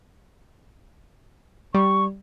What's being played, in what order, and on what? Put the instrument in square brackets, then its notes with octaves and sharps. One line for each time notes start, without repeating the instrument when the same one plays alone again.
[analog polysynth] G3 [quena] C#6